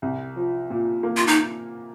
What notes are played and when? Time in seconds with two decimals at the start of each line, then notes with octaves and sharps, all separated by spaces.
0.02 C2
0.36 F3
0.70 A#2
1.03 A#3
1.17 F4
1.27 D#4